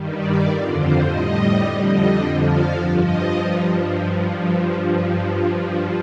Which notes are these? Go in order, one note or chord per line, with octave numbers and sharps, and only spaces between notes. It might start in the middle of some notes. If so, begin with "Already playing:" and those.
Already playing: G2 D#3 G3
D5
F2 D3 F3 A#4
C5
A2 G3 D#5
F2 D3 G3 D5
D#5
F2 D3 F3 G5
F5
G2 F3
D#5
G2 F3 D#5